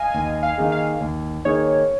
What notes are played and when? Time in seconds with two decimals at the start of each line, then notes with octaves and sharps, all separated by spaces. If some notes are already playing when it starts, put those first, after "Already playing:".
Already playing: D#5 F5 G#5
0.14 D#2 G#5
0.43 F5
0.57 D#3 A#3 D#4 G#4
0.72 F5
1.01 D#2
1.45 D#3 A#3 D#4 G#4 C#5